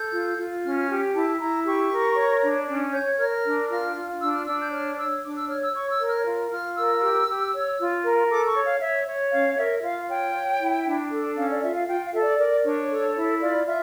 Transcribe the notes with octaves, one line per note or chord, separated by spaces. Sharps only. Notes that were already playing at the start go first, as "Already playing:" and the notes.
Already playing: A4 G6
F4
F4
C#4 F6
G4
E4 A5
E4 A#5
G4 C#6
A#4
C#5
D4
C#4
C#5 G6
A#4 F6
D4
F4 F6
F4
D4 E6
F6
D4 E6
G6
C#5 F6
C#5 E6
D4 D6
E6
C#5 F6
E6
C#5 C#6
E6
A#4
F6
F4
F4 F6
A#4 E6
G4
G4
C#5
F4
A#4
A4 D6
C#6
C#5
F5
C#5 E5
C#5
C#4 F5
A#4 E5
F4 F5
C#5 G5
C#5
E4
D4
A4
C#4 F5
D5
F4 E5
F5
F4 G5
F5
A4 E5
D5
A#4 D5
D4 C#5
A4
E4
F4 D5
F4 E5